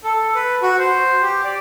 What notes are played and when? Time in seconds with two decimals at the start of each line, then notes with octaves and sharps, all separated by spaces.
0.04 A4
0.35 B4
0.63 F#4
0.78 C5
1.22 G4
1.44 D5